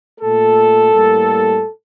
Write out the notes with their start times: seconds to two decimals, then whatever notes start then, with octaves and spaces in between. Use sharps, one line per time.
0.21 A#2 A3 A4
0.91 A2 G3 A#3